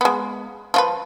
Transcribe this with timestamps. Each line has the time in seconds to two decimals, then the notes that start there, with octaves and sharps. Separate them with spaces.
0.01 G#3 B3
0.74 F3 F4 B4